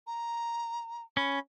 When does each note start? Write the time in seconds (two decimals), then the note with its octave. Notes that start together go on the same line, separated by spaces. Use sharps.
0.07 A#5
1.17 C#4 B5